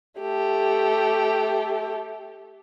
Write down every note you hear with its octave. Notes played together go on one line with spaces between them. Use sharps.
A3 G4